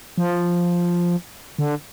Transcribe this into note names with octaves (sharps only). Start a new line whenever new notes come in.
F3
D3